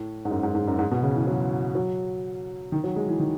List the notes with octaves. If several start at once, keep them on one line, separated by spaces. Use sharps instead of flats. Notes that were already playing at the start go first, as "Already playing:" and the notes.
Already playing: A2
G#2
F#2
G#2
G#2
F#2
G#2
B2
C#3
E3
F#3
F#3
D#3
F#3
G#3
E3
D#3